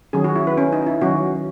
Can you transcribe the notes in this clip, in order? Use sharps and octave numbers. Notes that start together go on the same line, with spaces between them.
D#3 F#3 C#4 G#4
F#4
E4
B4
C#4
D#4
E4
D#3 F#3 C#4 F#4